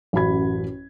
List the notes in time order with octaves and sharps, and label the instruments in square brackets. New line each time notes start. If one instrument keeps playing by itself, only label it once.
[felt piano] A1 F#2 F#4 B5 G#6